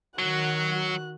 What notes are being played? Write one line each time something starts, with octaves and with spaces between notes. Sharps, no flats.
D#3 F#3 F#4 F#6